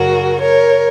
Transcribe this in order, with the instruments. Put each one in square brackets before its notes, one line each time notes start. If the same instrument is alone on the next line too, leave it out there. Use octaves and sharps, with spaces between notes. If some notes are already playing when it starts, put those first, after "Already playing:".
Already playing: [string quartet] F#2 C#3 F#3 F#4 A#4
A#4 C#5